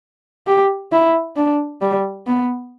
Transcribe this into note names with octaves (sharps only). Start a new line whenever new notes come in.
G4
E4
D4
G3
B3